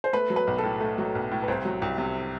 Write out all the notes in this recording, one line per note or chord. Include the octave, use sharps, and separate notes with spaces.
C5
A3 B4
F#3
B4
B1
A4
A2
A3
F#3
B1
A2
B4
C2 C5
F#3
C2
C3